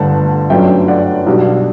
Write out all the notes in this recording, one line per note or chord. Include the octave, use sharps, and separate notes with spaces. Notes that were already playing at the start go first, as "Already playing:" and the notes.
Already playing: G1 G2 D3 A3 D4 F#5 A5
G1 F#2 F#3 A3 D4 E5 G5
D5 F#5
B1 B2 G3 D4